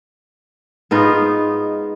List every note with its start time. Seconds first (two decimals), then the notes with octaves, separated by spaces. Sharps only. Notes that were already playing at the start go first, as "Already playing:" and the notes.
0.91 G#2 B3 D#4 F4